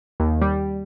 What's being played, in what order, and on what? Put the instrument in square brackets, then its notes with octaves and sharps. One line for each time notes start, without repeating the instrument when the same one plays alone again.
[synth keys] D#2
G3